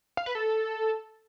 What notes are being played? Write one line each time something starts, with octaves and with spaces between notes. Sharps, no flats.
F5
B4
A4